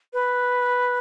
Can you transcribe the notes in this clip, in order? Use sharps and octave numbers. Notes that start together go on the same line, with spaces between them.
B4